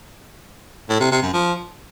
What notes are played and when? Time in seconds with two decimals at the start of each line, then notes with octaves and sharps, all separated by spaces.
0.89 A2
1.00 C3
1.11 C3
1.22 F#2
1.33 F3